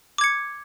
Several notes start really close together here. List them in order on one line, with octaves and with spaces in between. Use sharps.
D6 G#6 C#7